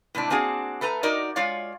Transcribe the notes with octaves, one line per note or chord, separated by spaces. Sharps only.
A2 C3 G#3 D4
A#3 C4 D4 F#4 G#4
A3 A4 B4 A#5
D#4 F#4 A#4 D5 D#5
G#3 F4 C#5 D5 F5